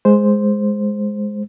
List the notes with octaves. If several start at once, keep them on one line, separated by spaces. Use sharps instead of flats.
G#3 C5